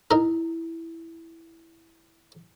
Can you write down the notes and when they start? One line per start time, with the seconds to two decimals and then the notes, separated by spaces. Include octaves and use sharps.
0.11 D#4 E4 A#4